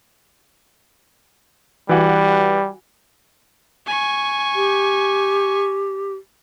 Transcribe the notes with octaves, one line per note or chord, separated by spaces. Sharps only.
E3 G3 F#4 F#5
G#5 C#6
G4